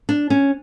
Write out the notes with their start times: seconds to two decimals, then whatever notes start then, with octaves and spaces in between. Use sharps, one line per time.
0.09 D4
0.30 C#4